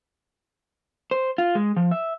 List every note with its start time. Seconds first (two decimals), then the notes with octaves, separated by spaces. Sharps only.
1.11 C5
1.38 F4
1.55 G#3
1.76 F3
1.91 E5